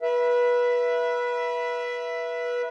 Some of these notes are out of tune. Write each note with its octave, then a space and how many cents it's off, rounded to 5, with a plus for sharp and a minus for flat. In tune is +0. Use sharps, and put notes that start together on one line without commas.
B4 -25 E5 +10